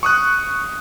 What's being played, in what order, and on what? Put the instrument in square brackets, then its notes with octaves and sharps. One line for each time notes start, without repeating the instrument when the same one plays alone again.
[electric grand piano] C#6 D#6 F#6